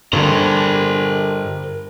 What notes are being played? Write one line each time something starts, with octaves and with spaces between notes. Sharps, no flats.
G2 D3 A#4 C5